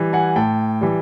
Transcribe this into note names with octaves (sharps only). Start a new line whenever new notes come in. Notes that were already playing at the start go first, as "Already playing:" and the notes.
Already playing: E3 G3
F#5 G#5
A2 G5 A5
E3 G3